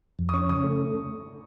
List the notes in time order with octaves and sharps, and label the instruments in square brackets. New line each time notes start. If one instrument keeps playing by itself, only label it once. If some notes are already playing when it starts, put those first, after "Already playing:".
[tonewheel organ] F2
[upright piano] D#6
[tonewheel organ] C#4 [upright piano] C#6
[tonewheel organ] C#3 [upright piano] D#6
[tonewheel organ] A3